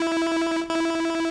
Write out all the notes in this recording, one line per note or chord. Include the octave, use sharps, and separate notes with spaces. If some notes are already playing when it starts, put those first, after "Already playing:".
Already playing: E4
E4